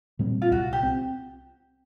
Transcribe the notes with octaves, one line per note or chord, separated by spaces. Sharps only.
A#2 G3 C4
F4
C2 F#4
G4
C4